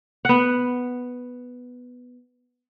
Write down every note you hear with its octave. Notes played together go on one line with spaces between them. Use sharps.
B3 F#5